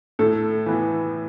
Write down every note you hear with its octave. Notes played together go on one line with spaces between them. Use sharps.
A2 A4
E3 B3